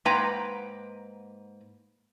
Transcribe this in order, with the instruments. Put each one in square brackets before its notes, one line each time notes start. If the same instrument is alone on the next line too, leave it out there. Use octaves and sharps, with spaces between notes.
[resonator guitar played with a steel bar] G#2 A#3 B4 G5 A#5